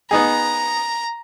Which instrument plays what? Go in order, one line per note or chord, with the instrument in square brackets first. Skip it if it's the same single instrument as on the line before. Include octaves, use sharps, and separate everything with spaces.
[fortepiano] B3 D#4 G#4 [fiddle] A#5